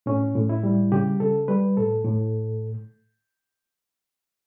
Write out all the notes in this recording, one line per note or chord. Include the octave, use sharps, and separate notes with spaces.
A2 C#4
A2
E4
G3
C#3 G4
C#3 A4
G3 B4
A2 A4
A2